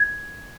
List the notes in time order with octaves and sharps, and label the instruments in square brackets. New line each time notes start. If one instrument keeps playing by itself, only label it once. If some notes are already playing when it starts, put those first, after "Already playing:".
Already playing: [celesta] G#6